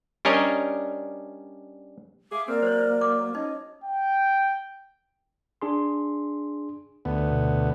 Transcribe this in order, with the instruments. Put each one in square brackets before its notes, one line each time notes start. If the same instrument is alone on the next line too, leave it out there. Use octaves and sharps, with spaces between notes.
[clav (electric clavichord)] G3 C#4 D4 A#4 C#5 D#5
[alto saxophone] G#4 [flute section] E5 F5 D6
[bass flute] A#3 [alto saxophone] C4 [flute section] A#4 D5 F6
[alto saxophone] F#3 [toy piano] C5 C#5
[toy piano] D6
[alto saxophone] C#4 [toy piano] D#4 [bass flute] D#5
[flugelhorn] G5
[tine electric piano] D4 G#4 C6
[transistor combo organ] D2 B3
[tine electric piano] B2